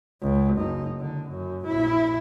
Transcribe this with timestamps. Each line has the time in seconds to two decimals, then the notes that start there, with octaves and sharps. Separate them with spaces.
0.22 C#2
0.56 F#1 D#4
0.99 D3
1.28 F#2
1.67 A#1 E4